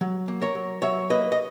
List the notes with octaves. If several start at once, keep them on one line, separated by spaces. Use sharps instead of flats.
F#3
A#3
A#4 C#5
F#3
F#3 C#5 E5
A#3 B4 D#5
D#5